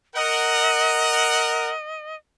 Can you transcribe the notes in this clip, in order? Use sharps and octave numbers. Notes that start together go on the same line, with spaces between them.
A#4 D#5 F#5